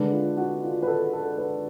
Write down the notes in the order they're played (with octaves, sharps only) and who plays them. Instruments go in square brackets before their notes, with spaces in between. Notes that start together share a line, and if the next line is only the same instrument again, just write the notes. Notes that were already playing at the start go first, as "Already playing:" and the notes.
Already playing: [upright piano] D3 G#3 D4 B4
F4
F#4
F4
B4
A4
A4
B4